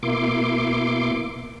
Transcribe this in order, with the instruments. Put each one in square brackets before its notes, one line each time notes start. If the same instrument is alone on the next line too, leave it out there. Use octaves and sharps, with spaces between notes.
[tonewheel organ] B2 A#3 E4 C6 D6